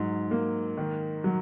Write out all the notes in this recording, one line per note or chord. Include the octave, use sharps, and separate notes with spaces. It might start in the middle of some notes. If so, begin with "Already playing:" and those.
Already playing: G#2 F#3
A#3
D#3
F#3